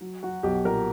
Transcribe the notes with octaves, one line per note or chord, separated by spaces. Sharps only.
F#3
F#3 F#4
B1 G4
A#2 A#4